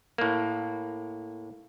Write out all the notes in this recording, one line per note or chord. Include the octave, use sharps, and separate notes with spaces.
A2 A#3